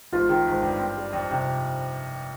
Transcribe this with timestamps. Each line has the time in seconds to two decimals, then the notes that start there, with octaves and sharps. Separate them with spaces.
0.13 G#1 F4
0.29 D#3
0.47 G#1
0.63 G2
0.79 C4
0.97 G3
1.13 F2
1.30 C3